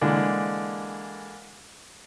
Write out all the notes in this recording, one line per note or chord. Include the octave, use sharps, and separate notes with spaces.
D3 E3 G#3 A#3 D4